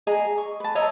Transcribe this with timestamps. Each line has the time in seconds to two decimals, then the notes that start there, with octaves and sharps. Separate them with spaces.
0.07 G#4 D#5 A#5
0.38 C#6
0.60 B4 A5
0.75 C#5 D#5 E5 A#5